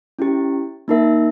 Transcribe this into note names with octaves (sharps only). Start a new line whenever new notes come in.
C#4 E4 G4
A#3 D#4 A#4 E5